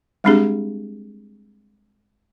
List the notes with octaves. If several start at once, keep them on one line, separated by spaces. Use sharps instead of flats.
G3 G#3 C4 D4 G4 G#4